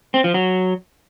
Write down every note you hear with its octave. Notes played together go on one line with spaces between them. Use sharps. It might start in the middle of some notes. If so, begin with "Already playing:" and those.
C4
F3
F#3